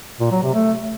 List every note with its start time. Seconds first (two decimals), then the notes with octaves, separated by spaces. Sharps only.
0.20 A#2
0.31 F#3
0.43 C3
0.54 A3